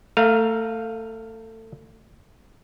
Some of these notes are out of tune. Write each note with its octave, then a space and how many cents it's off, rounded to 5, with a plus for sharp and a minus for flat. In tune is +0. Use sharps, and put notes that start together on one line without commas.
A3 +25 F5 +0 A#5 +0